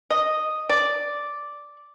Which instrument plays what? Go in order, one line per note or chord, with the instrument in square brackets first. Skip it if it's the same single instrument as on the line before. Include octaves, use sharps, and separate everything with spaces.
[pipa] D#5
D5